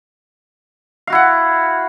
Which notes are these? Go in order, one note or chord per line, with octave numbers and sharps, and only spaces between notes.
E4 F#4 F5 F#5